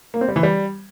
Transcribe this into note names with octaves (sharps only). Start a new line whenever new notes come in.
A#3
C4
G3
E3
G3